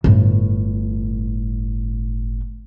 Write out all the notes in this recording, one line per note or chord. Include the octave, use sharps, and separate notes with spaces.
G1 A2